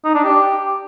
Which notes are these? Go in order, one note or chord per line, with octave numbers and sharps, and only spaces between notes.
D#4
D4
G4